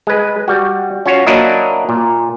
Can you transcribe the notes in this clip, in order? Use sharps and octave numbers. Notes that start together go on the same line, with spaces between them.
G#3 B4
G3 F#4
C#4 F4 F#4 C#5
F#3 A#3 D4 E4 A#4 D#5
A#2